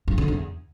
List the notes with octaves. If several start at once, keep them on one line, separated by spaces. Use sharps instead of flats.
G2
D3
E2